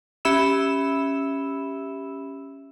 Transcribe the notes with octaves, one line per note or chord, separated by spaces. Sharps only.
C#4 G4 E5 B5 E6 E7